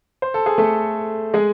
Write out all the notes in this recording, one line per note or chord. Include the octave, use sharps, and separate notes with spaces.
C5
A4
G#4
A3 A4
G#3 G#4